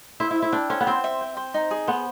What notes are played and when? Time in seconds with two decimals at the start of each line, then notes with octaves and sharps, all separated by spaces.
0.20 E4 C5
0.31 E4
0.36 E5
0.42 E4
0.52 D4 G5
0.70 C#4 C5
0.81 B3
0.87 C4 C5
1.04 E5
1.21 G5
1.37 C5
1.54 D#4
1.71 G#4
1.87 B3 C5